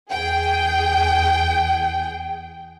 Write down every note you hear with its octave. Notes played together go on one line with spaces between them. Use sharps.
E2 G#4 G5